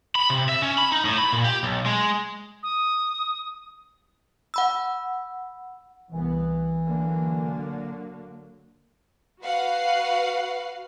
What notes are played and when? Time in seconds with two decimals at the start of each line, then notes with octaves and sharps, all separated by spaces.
0.15 B5
0.30 C3
0.49 E5
0.62 C#4
0.78 B5
0.92 D#4
1.05 A2
1.18 B5
1.32 A#2
1.44 G4
1.63 B1
1.86 G#3
2.63 D#6
4.54 F#5 B5 E6
6.11 C2 E3 B3
6.84 D3 F#3 A#3
9.42 F#4 B4 F5 F#5 C7